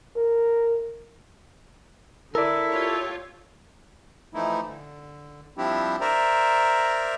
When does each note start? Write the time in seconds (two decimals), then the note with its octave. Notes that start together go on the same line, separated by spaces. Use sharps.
0.16 A#4
2.35 D3 E4 A4 A#4 D5
2.69 F4 G4 C#5
4.34 E3 F3 A3 D#4 E4
4.66 D3
5.58 F3 G3 C4 D4 E4 G4
6.01 A#4 C5 D5 E5 A#5